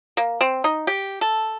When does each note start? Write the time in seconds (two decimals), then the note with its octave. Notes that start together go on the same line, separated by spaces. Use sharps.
0.17 A#3
0.41 C4
0.64 D#4
0.87 G4
1.21 A4